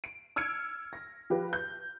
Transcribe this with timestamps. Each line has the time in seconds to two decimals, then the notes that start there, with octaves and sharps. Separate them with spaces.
0.04 D7
0.36 E6 F6 G#6 C#7 D7
0.93 A#6
1.30 F3 G4 B4
1.53 G6